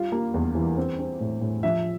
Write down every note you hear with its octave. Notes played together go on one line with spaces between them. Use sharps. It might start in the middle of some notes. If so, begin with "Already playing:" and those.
Already playing: G3 F4
A#3
E2
E3
C4
C4
A2
A2
F3 E5